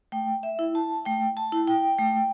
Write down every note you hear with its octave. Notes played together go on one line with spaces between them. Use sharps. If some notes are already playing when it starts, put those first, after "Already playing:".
A3 G5
E5
E4
A5
A3 G5
A5
E4
G5
A3